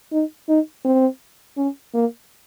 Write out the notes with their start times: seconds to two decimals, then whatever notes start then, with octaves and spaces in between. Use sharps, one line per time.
0.12 D#4
0.49 D#4
0.85 C4
1.57 C#4
1.94 A#3